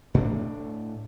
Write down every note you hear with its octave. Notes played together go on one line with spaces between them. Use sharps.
A2 A3 C4 D4